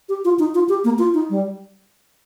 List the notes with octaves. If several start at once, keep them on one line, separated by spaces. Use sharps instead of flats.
G4
F4
D#4
F4
G4
A#3
F4
D#4
G3